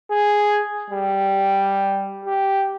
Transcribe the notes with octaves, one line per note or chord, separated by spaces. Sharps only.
G#4
G3
G4